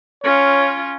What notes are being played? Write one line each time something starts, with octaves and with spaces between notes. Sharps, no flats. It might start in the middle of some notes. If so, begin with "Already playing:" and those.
C#4 F4 C#5